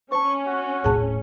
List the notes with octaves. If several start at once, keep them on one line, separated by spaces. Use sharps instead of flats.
C#4 C5 A5 C#6
F#4
D#1 A2 G#4 A5